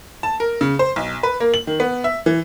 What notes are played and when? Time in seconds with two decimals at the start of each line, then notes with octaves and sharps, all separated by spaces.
0.23 A5
0.40 A#4
0.61 C#3
0.79 C5
0.96 B1
1.23 B4
1.40 A#3
1.54 F#7
1.67 D#3
1.80 B3
2.04 E5
2.26 E3